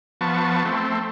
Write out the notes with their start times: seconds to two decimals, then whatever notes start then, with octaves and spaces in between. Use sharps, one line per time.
0.21 F3 B3 A5 C#6
0.65 A3 C4